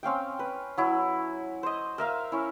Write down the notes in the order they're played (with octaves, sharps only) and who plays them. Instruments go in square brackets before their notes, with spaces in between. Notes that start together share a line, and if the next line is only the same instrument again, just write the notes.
[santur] C4 C#4 F5 G5
B4
F#3 E4
C5 D#5
A#4 E5 F5
C#4 E4